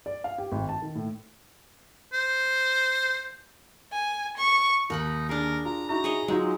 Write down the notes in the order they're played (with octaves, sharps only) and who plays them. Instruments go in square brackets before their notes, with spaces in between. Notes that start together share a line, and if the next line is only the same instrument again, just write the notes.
[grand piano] D5
F5
G4
G#1
A5
D#3
A2
[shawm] C5
[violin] G#5
C#6
[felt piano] D#2 [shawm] D#4 [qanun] A#4 F#5 B5
[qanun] D4 G#4 [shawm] A#4
[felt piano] F4 [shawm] A#5
[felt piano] D#4 E4 F#4 [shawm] A#5
[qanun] G#4 C#5 D#5
[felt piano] F#3 D#4 F4 [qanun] G#3